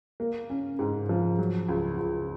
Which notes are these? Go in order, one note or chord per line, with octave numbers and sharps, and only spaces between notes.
A#3
C#4
G#2
F3
F#3
C#2
C#2